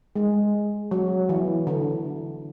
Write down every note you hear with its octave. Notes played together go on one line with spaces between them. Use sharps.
G#3
F#3
E3
D3